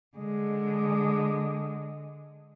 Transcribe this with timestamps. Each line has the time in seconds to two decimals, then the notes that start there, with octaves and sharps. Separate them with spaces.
0.17 D3 G#3